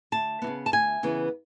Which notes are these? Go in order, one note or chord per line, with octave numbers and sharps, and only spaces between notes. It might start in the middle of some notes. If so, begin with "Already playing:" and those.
D2 A5
E3 B3
C#3
A5
D2 G#5
C#3 E3 B3